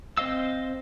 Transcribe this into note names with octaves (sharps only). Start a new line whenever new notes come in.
C4 C5 D#5 F5 E6